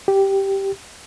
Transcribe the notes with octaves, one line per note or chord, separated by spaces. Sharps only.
G4